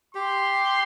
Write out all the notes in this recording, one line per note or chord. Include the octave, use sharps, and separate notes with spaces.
G4 C6